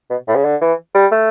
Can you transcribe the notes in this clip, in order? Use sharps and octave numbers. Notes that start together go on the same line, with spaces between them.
B2
A2
C#3
D3
E3
G3
A3